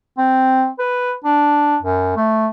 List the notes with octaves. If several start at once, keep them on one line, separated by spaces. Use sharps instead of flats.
C4
B4
D4
F#2
A3